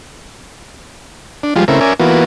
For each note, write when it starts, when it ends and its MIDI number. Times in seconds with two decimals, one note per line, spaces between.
1.43 1.54 62
1.56 1.65 53
1.56 1.65 55
1.56 1.65 56
1.56 1.65 65
1.68 1.80 49
1.68 1.80 57
1.68 1.80 60
1.68 1.80 64
1.68 1.80 70
1.81 1.93 61
1.81 1.93 70
1.81 1.93 74
1.81 1.93 76
1.81 1.93 80
2.00 2.24 52
2.00 2.24 58
2.00 2.24 59
2.00 2.24 65
2.00 2.24 66